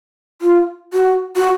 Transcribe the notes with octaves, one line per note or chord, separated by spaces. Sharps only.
F4
F#4
F#4